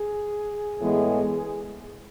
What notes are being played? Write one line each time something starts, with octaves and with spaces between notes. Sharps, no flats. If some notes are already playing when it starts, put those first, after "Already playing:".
Already playing: G#4
A2 E3 G#3 B3